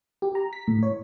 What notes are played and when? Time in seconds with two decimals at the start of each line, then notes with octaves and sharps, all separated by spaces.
0.22 G4
0.35 A#5
0.53 B6
0.67 A2
0.83 C#5